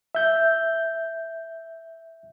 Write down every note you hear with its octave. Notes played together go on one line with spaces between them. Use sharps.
E5 G6